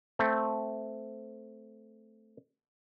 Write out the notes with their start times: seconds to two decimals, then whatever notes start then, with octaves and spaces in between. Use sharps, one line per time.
0.19 A3 C4